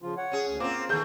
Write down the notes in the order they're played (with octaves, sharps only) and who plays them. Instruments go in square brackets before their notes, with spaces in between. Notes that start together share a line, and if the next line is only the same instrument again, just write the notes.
[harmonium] C#3 F3 F4
C#5 F#5
[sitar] C#4 G#4
[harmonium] D2
[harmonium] A#3 F4 F5 [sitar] C4 C#4 [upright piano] D6
[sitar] D#3 A3 [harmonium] E3 B3 [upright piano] G#4 G6